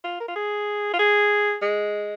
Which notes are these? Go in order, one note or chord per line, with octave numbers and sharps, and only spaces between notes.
F4
A#4
F4
G#4
F4
G#4
G#3